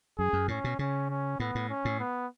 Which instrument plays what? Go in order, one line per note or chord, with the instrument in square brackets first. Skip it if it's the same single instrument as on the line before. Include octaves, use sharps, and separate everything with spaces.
[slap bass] F#2 [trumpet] G#4
[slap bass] F#2
[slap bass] A2 [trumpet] C#4
[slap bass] B2
[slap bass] C#3 [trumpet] C#4
[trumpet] C#4
[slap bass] A2 [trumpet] B3
[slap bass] A2
[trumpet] C#4
[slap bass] A2
[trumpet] B3